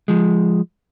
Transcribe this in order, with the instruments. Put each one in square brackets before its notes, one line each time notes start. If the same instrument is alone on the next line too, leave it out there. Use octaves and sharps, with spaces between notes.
[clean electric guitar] F3 G#3